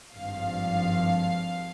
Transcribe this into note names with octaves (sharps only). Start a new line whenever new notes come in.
G#1 G2 F3 F5